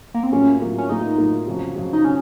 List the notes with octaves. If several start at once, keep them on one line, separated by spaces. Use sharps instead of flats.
A#3
C4
A2 F#3 A#3 C#4 F4
A2 F#3 A#3 F4
C#4
A2 F#3 A#3 D#4 F4
A2 F#3 A#3 F4
F2 C#3 F#3
F2 C#3 F#3
D#4
C#3 C#4